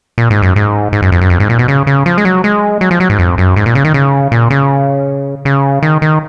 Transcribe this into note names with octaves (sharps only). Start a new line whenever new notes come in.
A#2
G#2
F#2
G#2
G#2
F#2
F2
F#2
F2
G#2
A#2
B2
C#3
C#3
F3
G#3
F#3
G#3
F#3
F3
F#3
G#2
F2
F#2
G#2
A#2
C#3
D#3
C#3
A#2
C#3
C#3
D#3
D#3